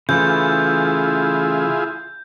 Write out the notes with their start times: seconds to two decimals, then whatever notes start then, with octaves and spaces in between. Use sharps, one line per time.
0.09 C#3 E3 A3 E4 F4 G#4 G6